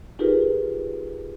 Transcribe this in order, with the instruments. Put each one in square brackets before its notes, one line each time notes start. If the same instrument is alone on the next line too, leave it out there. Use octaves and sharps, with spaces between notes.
[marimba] D#4 F4 G4 G#4 A#4 B4